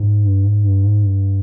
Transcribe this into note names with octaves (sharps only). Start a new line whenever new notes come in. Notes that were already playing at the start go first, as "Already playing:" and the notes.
Already playing: G#2
G2
G#2
G2
G#2
G2